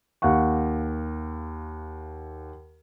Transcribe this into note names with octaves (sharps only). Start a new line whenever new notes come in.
D#2 F5 F#5 C#6